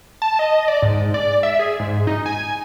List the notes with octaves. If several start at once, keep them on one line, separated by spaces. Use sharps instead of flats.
A5
D#5
D5
G#2
D5
E5
G#4
G#2
D#4
G#5